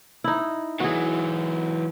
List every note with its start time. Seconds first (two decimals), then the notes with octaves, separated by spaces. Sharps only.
0.24 D#4 E4
0.80 E3 F#3 F#4 G#4